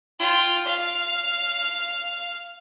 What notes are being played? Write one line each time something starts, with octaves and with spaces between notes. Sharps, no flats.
F4 G5
F5